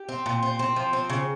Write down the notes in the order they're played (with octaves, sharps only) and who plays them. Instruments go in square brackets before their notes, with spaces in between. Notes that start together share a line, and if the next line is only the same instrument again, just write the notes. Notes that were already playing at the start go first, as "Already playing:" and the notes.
Already playing: [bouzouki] G4
C4
A#2
C4
C4
F3
C4
C#3